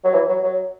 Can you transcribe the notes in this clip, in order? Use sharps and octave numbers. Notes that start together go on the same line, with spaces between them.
F#3
E3
F#3
F#3